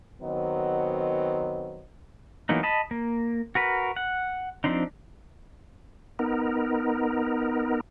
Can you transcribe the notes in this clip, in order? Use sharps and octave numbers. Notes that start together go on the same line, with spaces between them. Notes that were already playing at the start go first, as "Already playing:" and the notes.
D#3 F#3 B3 C4 D#5
E3 F#3 A#3 B3 D#4
D#5 A5 B5
A#3
F#4 A#4 B4
F#5
F3 C4 D4 D#4
B3 D#4 A#4